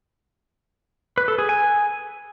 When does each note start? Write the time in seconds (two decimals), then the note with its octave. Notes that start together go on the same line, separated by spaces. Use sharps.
1.18 B4
1.28 A4
1.38 G#4
1.49 G#5